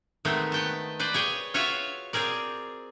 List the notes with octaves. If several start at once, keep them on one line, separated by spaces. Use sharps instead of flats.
D#3 G#3 A3 B3 C4
B3 G5 A5
B4 C5 D5
G#4 C#5 G5
F4 F#4 C#5 E5 F5
C4 G#4 A#4 D5